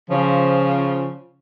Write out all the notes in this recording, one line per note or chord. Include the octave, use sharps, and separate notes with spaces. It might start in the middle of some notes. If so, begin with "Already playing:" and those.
C#3 F3